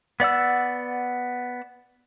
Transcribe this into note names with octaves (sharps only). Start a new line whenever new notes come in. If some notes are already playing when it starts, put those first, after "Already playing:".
B3 D5 F#5 E6